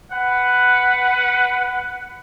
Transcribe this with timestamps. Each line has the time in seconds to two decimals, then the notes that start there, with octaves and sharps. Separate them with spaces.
0.12 B4 F#5